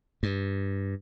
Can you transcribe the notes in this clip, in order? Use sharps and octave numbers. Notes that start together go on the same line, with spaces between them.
G2